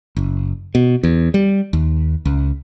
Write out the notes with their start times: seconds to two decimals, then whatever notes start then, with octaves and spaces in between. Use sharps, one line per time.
0.17 F#1
0.75 B2
1.03 E2
1.34 G3
1.73 D#2
2.25 C#2